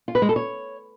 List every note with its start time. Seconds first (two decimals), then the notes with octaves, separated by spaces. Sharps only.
0.08 F4
0.15 B4
0.22 G#3
0.29 A4
0.36 C#5